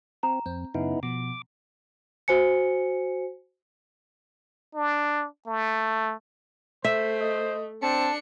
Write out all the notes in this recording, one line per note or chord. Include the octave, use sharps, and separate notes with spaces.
C4 A#5
F2 C4
F#2 C#3 B3 D#4 E4
B2 F3 D6
F#4 C5 G#5 C#7
D4
A3
A3 C5 E5
D#5
C4 D4 A5 C#7